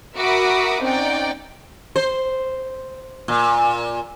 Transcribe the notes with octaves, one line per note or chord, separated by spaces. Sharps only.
F#4 A#4 E5 B5 D6 D#6
C4 C#4 D#4 D5 F#5 G5
C5
A#2